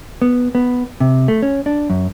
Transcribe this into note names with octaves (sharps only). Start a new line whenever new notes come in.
B3
B3
C3
A3
C#4
D4
F#2